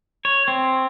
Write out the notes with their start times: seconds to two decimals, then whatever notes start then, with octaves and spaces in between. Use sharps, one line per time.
0.25 C#5
0.48 C4